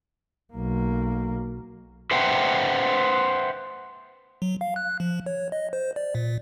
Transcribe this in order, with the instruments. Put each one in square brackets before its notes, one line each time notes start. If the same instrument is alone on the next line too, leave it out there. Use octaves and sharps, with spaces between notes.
[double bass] B1 A#3
[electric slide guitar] B4 C5 E5 F#5 G5
[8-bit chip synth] F#3
F5
F#6
F3
C#5
D#5
C5
D5
A#2